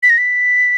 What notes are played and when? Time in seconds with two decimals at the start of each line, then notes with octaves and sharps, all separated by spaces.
0.03 B6
0.10 A#6
0.18 B6